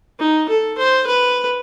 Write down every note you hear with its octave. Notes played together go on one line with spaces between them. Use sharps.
D#4
A4
C5
B4